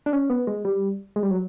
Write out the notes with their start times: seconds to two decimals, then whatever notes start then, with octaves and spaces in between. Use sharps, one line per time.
0.06 D4
0.13 C#4
0.30 B3
0.47 G#3
0.65 G3
1.16 G#3
1.23 G3
1.31 F#3